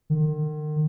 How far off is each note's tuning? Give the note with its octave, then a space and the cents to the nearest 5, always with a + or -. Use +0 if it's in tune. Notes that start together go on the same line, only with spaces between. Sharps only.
D#3 -40